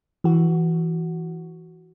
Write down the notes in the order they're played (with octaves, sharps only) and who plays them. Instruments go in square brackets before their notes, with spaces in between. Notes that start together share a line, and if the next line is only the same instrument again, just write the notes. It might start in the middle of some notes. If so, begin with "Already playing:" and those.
[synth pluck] E3 F#4